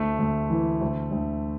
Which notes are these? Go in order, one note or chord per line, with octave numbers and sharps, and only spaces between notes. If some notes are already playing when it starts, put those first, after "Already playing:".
Already playing: D2 A3
D2
E3
D2
D2